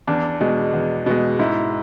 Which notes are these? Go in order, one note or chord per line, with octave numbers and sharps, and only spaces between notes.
E2 D4
B2 G#3
E2
B2 G#3
G#2 E4